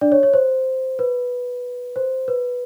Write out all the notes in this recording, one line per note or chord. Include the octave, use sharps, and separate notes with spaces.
D4 D5
C#5
C#5
C5
B4
C5
B4